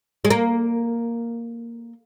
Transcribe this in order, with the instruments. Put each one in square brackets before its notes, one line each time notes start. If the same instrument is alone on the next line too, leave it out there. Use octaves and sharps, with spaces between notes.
[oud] G#3
A#3